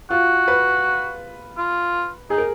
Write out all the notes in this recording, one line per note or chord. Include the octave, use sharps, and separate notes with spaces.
F4 F#4
B4
F4
D#4 G#4
A#4